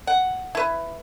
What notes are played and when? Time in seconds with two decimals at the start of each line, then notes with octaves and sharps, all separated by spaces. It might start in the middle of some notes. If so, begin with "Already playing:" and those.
0.07 F#5
0.55 E4 B4